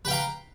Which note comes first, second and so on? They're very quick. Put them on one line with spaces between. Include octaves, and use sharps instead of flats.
B4 G5 F5 A#5